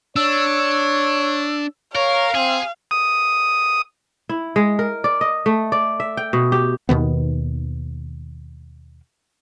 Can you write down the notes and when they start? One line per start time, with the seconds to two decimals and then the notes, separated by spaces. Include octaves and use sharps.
0.16 D4 C#5 E6
1.95 A#4 C#5 F5
2.35 C4 G#4
2.91 D#6
4.29 E4
4.56 G#3
4.79 A#4
5.04 D5
5.21 D#5
5.46 A3
5.72 D5
6.00 E5
6.17 G5
6.33 B2
6.52 G4
6.89 D#2 B2 D#3 B3